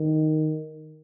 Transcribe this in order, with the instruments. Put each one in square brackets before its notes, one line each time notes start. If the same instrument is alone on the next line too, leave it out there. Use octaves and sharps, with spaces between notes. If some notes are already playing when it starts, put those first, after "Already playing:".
Already playing: [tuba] D#3